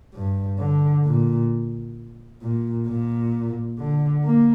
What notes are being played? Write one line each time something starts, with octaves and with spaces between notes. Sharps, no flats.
G2
D3
A#2
A#2
A#2
D3
A#3